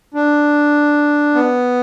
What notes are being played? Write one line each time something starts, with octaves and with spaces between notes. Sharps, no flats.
D4
B3